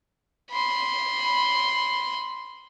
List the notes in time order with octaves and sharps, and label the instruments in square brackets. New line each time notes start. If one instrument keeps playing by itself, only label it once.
[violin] B5 C6